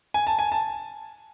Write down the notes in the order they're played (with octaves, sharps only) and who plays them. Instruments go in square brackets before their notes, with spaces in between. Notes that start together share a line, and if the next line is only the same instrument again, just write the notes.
[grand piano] G#5
A5
G#5
A5